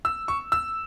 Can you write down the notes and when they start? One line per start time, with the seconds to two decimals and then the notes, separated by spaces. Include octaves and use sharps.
0.05 E6
0.28 C#6
0.52 E6